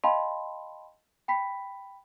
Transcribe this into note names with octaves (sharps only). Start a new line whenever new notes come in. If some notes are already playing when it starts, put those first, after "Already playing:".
D#5 F5 G5 A5 B5 C6
G5 B5 B6